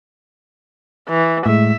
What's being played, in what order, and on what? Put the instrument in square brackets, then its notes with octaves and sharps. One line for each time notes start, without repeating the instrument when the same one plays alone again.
[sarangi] E3
[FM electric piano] A2 G#3 [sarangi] E5